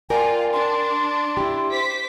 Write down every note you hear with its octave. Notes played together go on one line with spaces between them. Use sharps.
F4 A#4 D5 G5 G#5
D4 C6
E4 G4
C5 D6 B6